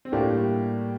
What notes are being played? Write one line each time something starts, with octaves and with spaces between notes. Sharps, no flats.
C4
A2 A3 A#3 D4 G4
G3